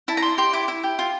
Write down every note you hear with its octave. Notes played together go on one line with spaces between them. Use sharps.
E4 A5
A#5
D5 C6
G4 C6
E4 D6
E4
G4
F4